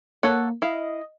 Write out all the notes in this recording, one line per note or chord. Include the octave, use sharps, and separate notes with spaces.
A#3 A4 C#5 F#5
E4 D#5 F5